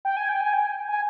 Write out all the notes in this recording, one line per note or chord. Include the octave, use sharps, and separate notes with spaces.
G5
G#5
G5
G#5
G5
G#5